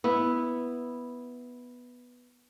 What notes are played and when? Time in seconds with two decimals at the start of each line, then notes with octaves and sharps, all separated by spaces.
0.04 B3 E4